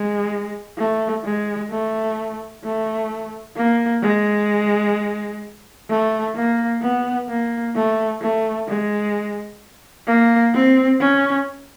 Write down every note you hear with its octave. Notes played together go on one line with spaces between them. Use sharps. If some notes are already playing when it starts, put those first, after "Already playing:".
Already playing: G#3
A3
G#3
A3
A3
A#3
G#3
A3
A#3
B3
A#3
A3
A3
G#3
A#3
C4
C#4